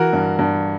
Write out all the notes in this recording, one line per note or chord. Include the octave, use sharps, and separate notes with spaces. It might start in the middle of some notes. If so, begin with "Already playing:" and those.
Already playing: E3 F#4 A#4
G2
G2